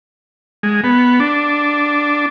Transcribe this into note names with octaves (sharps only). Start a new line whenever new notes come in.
G#3
B3
D4